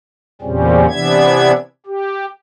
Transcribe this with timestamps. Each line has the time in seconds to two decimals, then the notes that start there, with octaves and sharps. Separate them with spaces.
0.42 E2 A#2 C#3 G3 C4 C#4
0.89 C3 E3 B3 D4 E5 G#6
1.86 G4